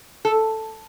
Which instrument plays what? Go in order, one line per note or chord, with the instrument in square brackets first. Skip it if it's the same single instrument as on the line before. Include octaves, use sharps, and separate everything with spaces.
[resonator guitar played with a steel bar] A4